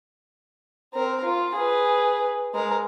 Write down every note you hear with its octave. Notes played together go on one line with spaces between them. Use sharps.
C4 A#4
F4
G#4 B4
G#3 A#4